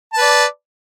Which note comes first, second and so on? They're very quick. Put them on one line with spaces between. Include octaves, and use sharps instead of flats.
A5 B4 D5